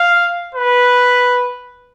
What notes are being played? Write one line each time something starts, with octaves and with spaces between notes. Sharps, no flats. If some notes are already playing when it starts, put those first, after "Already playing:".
Already playing: F5
B4